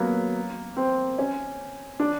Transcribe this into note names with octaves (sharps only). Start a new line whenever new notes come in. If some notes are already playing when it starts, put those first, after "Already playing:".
Already playing: F#3 A#3 B3
C4
C#4
D4